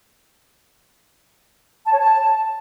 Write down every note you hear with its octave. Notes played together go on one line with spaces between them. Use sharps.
A5
C#5
A5